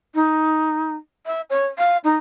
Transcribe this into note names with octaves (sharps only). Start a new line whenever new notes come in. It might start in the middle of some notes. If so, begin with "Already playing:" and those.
D#4
E5
C#5
F5
D#4